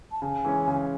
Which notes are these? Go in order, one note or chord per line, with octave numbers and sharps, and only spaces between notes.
A5
C#3 G#5
E3 G#3 C#4
C#3